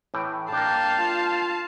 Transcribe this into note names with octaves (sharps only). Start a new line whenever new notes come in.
A2 E3 G5
A#3 D4 F5 G5 A5
F4